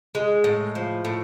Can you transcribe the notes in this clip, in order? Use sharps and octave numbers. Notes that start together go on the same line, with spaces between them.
G#3
A2
F3
A2